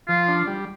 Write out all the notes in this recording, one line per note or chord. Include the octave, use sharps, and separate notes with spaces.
F3 F4
D4
G3